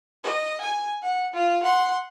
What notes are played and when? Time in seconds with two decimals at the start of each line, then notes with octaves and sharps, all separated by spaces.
0.24 D#5
0.61 G#5
1.03 F#5
1.34 F4
1.63 F#5 C6